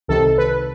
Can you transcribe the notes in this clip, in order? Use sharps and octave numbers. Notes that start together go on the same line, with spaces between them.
C2 C3 D#3 A4
B4